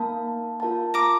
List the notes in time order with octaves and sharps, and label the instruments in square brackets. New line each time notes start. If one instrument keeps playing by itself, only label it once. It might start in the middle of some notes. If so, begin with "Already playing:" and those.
Already playing: [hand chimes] A#3 D#4 A#4 F5 A5
F4 A#4 F5 A5
[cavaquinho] A#5 D6